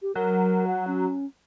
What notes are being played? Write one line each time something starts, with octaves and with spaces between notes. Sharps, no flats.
G4
F#3 A#4
F#5
C#4